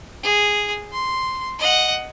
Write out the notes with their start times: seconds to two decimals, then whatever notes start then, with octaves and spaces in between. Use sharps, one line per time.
0.23 G#4
0.92 C6
1.59 D#5 F#5